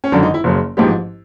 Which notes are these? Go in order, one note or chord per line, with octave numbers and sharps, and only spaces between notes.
C#4
G#1 F#2 D3 D4
D#4
E4
F#1 F#2 C#3
A1 G#2 F3 G4